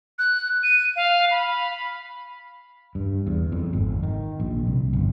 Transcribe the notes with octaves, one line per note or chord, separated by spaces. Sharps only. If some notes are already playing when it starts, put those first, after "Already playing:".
F#6
D#7
F5
B5
G2
E2
F2
G#1
D#3
A#1
C2
G1